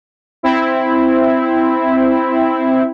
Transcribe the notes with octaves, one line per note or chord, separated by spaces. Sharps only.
C4 E4